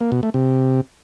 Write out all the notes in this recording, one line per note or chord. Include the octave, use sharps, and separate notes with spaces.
A#3
B2
A3
C3